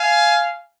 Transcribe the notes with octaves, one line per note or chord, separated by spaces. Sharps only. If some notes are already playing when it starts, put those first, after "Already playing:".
Already playing: F5 G#5